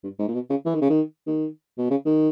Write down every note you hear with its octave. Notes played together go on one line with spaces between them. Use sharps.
G2
G#2
A#2
B2
C#3
E3
D#3
C#3
D#3
D#3
B2
C#3
D#3